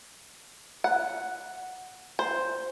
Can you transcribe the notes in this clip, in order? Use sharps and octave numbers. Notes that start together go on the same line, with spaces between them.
F#5
C5